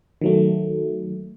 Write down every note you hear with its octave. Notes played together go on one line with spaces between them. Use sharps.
D#3 F#3 A3